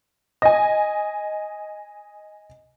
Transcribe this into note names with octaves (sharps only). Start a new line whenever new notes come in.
D#5 G#5